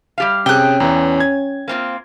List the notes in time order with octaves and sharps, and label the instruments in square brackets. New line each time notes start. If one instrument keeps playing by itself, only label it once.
[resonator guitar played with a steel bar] G3 G4 F5
[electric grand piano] C3 G#4 [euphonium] C#4 [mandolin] G5 F#6
[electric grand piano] E2 E3 [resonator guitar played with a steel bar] A#5
[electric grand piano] G#6
[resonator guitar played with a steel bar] A#3 C4 F4